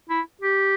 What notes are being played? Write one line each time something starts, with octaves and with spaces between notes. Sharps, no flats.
E4
G4